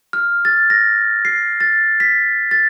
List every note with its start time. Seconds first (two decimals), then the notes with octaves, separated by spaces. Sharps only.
0.13 F6
0.45 A6
0.70 A#6
1.25 C7
1.60 A6
2.00 B6
2.51 A6